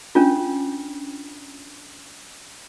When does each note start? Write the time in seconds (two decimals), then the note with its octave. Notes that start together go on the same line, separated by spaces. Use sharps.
0.15 C#4 D4 F4